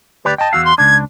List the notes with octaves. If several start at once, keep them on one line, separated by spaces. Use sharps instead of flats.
D2 G4 B4 D5
D#5 G5 A5
E2 F#4 F5 E6
C6
C#2 D4 G#6